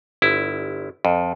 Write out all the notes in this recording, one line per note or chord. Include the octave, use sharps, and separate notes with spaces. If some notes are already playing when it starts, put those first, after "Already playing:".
G1 E4
F2